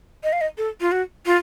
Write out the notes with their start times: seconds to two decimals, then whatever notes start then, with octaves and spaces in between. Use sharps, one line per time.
0.24 D#5
0.33 F5
0.41 D#5
0.58 A4
0.81 F4
0.92 F#4
1.26 F4